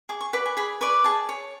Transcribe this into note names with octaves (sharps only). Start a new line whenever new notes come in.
G#4 D6
C#6
B4 D5 F#5
G#5
G#4 B5
B4 D5 C#6
G#4 A5
C#5